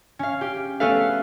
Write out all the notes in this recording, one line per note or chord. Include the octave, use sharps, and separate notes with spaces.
C#4 F5
G4
A3 B3 C#4 A4 B4 F5